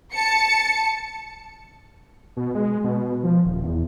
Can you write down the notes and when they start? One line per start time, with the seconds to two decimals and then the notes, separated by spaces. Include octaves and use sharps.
0.14 A5 C#7
2.37 B2
2.55 G#3
2.84 B2
3.23 F3
3.45 D#1
3.64 E2